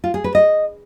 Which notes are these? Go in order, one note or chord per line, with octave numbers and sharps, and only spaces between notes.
F4
G#4
B4
D#5